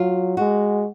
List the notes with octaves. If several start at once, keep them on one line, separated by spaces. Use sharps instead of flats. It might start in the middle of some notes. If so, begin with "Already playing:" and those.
Already playing: F#3 F4
G#3 F#4